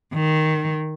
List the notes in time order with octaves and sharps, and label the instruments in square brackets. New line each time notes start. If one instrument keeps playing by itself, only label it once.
[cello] D#3